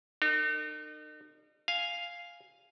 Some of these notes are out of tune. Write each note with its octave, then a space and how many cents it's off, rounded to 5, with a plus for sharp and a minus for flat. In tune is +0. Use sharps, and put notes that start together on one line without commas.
D#4 -40 A#4 -40
F5 +0 G#5 +0